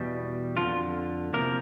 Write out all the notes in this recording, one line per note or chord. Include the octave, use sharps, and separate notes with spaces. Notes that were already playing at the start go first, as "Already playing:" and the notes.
Already playing: E2 B2 G3
F2 D3 F3 F4
E2 C3 F3 A#3 A#4